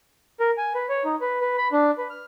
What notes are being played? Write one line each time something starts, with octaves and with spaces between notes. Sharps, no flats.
A#4
G#5
B4
C#5
D#4
B4
B4
B5
D4
B4
F6